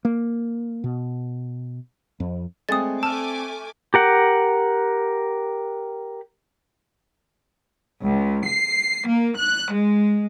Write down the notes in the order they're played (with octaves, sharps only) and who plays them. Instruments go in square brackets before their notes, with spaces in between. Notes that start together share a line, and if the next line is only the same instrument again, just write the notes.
[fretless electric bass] A#3
B2
F2
[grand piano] G#3 A3 G#4 [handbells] C4 D5 [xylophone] D#6 A6
[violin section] A3 G#5 D6 [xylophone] A5 [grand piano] E6 F6
[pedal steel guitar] G4 A#4 F#5
[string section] C#2
C7
A#3
F#6
G#3